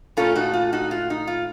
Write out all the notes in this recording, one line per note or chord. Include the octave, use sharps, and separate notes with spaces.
A#2 A3 C#4 F4 A4
D#4 F#4
F4
D#4 F#4
F4
D#4
F4